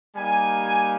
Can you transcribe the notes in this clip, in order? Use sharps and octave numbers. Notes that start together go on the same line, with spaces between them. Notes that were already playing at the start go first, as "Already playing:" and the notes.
G3 A#3 D#4 G4 G#5